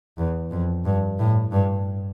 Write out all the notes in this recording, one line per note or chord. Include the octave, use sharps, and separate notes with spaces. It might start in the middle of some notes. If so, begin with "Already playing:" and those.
E2
F2
G2
A2
G2